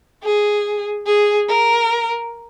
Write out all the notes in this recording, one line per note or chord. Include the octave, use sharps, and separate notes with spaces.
G#4
G#4
A#4